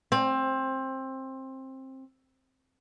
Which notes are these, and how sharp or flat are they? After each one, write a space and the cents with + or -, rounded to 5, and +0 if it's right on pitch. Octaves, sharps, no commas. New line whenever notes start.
C4 +20